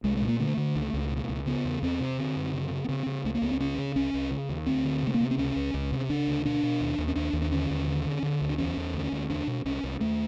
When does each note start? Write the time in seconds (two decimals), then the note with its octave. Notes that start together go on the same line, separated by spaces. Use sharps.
0.04 C2 G#3
0.17 G#3
0.22 A#2
0.28 A#3
0.40 D3 A3
0.57 D3
0.75 C#2
0.94 C#2
1.11 B2
1.29 C#2
1.46 C#3 B3
1.65 E2
1.82 E2 C4
2.00 C3
2.18 D3
2.36 F#2
2.53 C#3
2.71 C#3
2.84 B3
2.89 C#3 C4
3.07 C#3
3.24 C#2 A3
3.34 A#3
3.42 C#2 B3
3.52 C4
3.60 C#3 C#4
3.78 C#3
3.96 C2 C#4
4.14 C2
4.31 C#3
4.49 D#2
4.66 D2 C4
4.85 D3
5.03 C3 A3
5.14 A#3
5.20 C3 B3
5.31 C4
5.38 C#2 C#4
5.56 C#2
5.74 C#2
5.92 C3
6.10 C#3 D4
6.27 D2
6.45 B2 D4
6.63 B2
6.81 D#2
6.98 D#2
7.08 C#4
7.16 D#2 D4
7.33 D#2
7.42 D4
7.51 D3 C#4
7.70 D#2
7.87 D3
8.05 D3
8.23 D3
8.41 D2
8.49 D4
8.58 E2 C#4
8.77 E2
8.94 D2
9.12 D2
9.30 E2 D4
9.47 B2
9.65 C2 C#4
9.84 C2
10.01 D#2 A3